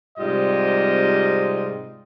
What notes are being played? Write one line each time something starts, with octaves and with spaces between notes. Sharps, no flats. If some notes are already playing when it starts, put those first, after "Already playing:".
G#2 C3 G3 F4 D#5